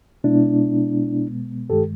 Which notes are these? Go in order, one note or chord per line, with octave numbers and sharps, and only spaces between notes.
B2 G#3 B3 D4 E4
G2 D#3 G#3 G4 A4